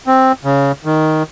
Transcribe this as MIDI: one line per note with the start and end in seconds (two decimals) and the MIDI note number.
0.07 0.32 60
0.44 0.72 49
0.85 1.23 51